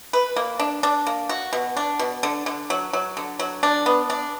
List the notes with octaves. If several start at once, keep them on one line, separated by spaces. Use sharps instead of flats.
B4
A#3
D4
D4
A#3
F#4
B2
D4
B2
D3
D3
F#3
F#3
D3
F#3
D4
B3
D4